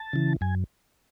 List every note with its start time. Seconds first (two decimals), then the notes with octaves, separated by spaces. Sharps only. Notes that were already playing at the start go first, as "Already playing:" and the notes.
Already playing: A5
0.13 C#3 E3
0.41 F#2 G#5